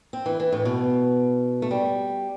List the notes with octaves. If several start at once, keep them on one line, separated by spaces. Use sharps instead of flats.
C4
E3
E3
A2
B2
A3
G3